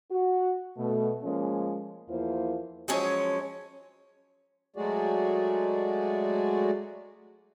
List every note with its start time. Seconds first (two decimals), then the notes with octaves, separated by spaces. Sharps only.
0.10 F#4
0.77 B2 A3
1.23 F3 G#3 A#3 C#4
2.09 E2 F3 A#3 E4 F4 C5
2.88 F3 F#3 G#3 C#4 C#5
4.76 F#3 G#3 A3 F#4 G#4 D5